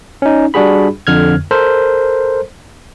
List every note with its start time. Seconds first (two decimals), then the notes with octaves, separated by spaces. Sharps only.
0.22 C#4 D#4
0.54 G3 D4 F#4 G#4 B5
1.07 F2 D3 F6 G#6
1.51 A4 A#4 C5